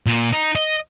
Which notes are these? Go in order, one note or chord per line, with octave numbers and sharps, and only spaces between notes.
A#2
D#4
D#5